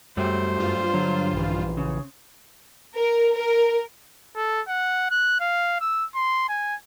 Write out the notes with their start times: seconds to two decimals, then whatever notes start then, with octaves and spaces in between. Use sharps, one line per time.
0.17 F#2 F#3 G3 A3 C5
0.58 G2 F4
0.94 D3 F#3
1.33 A#1 E3
1.77 C#3
2.97 A#4
3.33 A#4
4.36 A4
4.68 F#5
5.10 F#6
5.40 F5
5.80 E6
6.15 C6
6.49 G#5